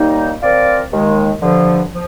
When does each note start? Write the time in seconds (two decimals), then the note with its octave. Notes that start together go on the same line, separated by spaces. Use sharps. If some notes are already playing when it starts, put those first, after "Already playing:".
Already playing: D#2 D#3 G3 A#3 D#4
0.42 F3 C4 F4 A#4 D5
0.92 D#2 D#3 G#3
1.42 G2 D3 F3
1.92 F3